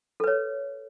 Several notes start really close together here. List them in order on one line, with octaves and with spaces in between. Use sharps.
A4 B4 C#5